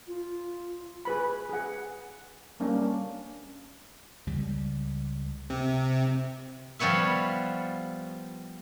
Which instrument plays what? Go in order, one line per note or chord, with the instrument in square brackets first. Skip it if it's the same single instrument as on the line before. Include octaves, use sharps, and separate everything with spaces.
[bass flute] F4
[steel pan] G#4 B4 B5
G#4 F#5
G3 A#3 C#4 D4
[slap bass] C#2 G3
[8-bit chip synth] C3
[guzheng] F3 G3 B3 C#5 E5